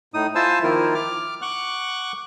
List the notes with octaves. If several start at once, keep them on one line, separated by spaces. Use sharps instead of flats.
A2 D#4 D#6
E4 F4 C5 G#5 A5 E6
D#3 F3 A#3 E4 F4 A#4
D6 F6
F#5 C#6 D6 F#6